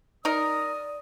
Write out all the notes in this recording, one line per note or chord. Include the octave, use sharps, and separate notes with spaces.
D#4 A#4 D5 D#6